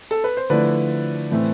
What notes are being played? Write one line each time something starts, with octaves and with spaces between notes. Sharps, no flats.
A4
B4
C5
D3 F3 A3 E4 B4 D5
A2 E3 A3 C4